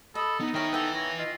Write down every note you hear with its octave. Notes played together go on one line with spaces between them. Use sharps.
A4 D#5 B5
B3 D#4
D#3 E4 A#4 C#5 G5
A4 B4 E5 F#5 G5 D6
C#5 A#6
F4 D#5